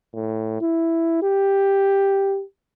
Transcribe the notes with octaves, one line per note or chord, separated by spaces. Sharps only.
A2
E4
G4